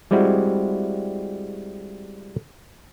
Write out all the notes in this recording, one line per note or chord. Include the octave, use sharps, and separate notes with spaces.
G3 G#3 C4 E4 F#4